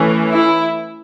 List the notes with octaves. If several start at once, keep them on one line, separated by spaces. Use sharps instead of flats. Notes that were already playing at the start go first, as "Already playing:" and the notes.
Already playing: E3 A3 C#4
E4